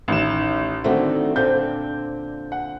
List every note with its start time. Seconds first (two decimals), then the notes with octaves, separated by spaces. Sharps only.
0.08 A1 D#3 E7
0.84 D3 D#3 A3 C4 F#4
1.36 A#2 D3 C4 G6
2.52 F#5